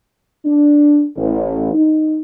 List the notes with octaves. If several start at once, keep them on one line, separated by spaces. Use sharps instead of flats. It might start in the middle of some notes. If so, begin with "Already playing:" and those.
D4
A1
D#4